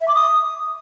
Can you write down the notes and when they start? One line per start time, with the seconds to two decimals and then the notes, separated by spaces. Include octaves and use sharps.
0.01 E5
0.08 D6
0.15 D#6